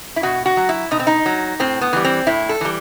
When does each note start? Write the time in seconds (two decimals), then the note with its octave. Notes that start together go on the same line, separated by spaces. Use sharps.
0.16 E4
0.23 B2 F#4
0.46 F#4
0.57 F#3
0.69 E4
0.91 B2 D#4
1.00 C4
1.07 D#4
1.26 F#3
1.60 A2 C4
1.81 B3
1.93 E3 G3
2.05 C4
2.27 A2 E4
2.49 A4
2.61 E3 G3